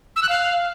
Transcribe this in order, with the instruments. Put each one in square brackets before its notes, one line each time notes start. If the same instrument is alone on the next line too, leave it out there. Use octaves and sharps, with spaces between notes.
[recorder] E6
F#6
F5